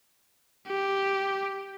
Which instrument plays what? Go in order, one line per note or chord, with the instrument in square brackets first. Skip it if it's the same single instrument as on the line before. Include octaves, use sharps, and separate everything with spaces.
[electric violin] G4